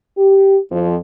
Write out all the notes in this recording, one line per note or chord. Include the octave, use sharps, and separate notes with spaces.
G4
F2